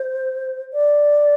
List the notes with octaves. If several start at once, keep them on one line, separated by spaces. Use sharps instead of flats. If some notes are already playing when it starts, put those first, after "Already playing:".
Already playing: C5
D5